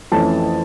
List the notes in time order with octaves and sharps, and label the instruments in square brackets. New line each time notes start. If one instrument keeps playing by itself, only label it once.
[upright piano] F2 E3 A3 C#4 A5